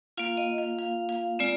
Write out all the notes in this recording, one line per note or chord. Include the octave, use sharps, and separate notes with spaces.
A#3 F4 F5
D#5
F5
F5
F5
G#3 C4 F4 D5